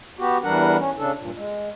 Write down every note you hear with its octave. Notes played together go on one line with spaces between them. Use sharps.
B3 F#4 G4
E2 E3 G3 D4 A#4 F#5
C#4
C#3 D4 A4
G2 A#2
G#3